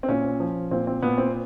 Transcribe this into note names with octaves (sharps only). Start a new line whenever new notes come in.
C4
A#2 C#4
F3
A#2 C4
C4
A#2 B3
C4